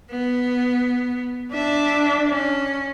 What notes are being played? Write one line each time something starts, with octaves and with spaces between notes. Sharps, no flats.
B3
D4 E5
C#4